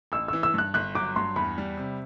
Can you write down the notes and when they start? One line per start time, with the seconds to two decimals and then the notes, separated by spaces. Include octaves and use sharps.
0.12 A1 E6
0.28 E3 E6
0.43 E6
0.54 G2 F#6
0.74 G1 F#6
0.94 F#3 D6
1.16 G2 C6
1.36 E2 B5
1.58 G3
1.77 C3